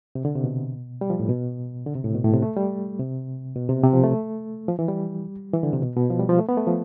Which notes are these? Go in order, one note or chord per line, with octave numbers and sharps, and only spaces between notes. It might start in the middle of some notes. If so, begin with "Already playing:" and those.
C3
D3
C3
B2
G3
F3
A2
B2
D3
C3
A2
B2
A2
C3
A3
G3
C3
B2
C3
C3
F3
A3
F3
E3
G3
E3
D3
C3
B2
B2
F3
G3
F3
A3
B3
A3
F3